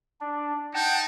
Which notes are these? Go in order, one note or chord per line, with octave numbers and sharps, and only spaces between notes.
D4
D#4 F#5 G5 A5